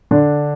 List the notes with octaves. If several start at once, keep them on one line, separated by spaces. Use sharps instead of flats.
D3 D4